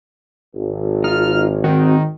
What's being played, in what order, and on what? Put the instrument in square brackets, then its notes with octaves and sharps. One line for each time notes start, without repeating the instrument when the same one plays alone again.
[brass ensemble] G#1
[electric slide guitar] D#4 F4 [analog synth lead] F6
[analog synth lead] D#3 [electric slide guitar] C4 F#4